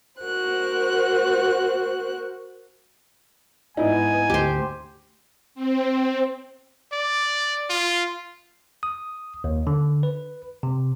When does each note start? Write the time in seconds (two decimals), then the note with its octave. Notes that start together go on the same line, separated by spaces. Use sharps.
0.21 F#4 A#4 C5 F#6
3.77 G#2 B3 D#4 E4 G#5
4.30 D2 G4 C5
5.55 C4
6.92 D5
7.70 F4
8.83 D#6
9.44 D#2
9.67 D3
10.03 B4
10.63 C3